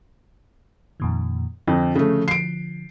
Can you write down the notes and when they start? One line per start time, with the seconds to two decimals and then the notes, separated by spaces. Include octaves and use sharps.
1.00 F2 A#2 D#3
1.67 F2 D3 F3
1.95 C#3 A3
2.28 C7 D7